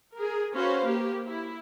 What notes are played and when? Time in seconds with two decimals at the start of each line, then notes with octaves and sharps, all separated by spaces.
0.15 G#4 A#4
0.54 C#4 F#4 B4 C5 F5
0.84 A#3 G4
1.27 E4